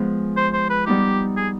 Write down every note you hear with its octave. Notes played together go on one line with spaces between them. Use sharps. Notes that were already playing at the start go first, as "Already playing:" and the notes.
Already playing: F3 G#3 B3
C5
C5
B4
G3 B3 D#4 G4
G#4